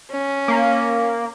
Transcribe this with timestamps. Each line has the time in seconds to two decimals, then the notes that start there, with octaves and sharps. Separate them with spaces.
0.11 C#4
0.48 A#3